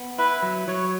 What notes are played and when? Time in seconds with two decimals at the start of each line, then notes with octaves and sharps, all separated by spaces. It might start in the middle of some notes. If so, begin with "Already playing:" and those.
Already playing: B3
0.18 E4 B4
0.42 F#3
0.68 F#3 C#5